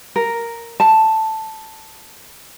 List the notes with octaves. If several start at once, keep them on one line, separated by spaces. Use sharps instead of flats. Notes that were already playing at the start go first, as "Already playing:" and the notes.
A#4
A5